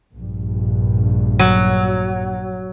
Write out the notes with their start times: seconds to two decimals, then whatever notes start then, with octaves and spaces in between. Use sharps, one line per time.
0.17 A#1 G2
1.39 F#3